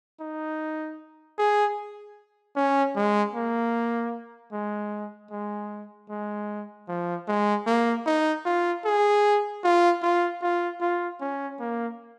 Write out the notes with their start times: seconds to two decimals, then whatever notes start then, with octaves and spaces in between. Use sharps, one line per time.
0.20 D#4
1.38 G#4
2.56 C#4
2.96 G#3
3.34 A#3
4.52 G#3
5.31 G#3
6.09 G#3
6.88 F3
7.28 G#3
7.67 A#3
8.06 D#4
8.46 F4
8.85 G#4
9.64 F4
10.02 F4
10.42 F4
10.81 F4
11.21 C#4
11.60 A#3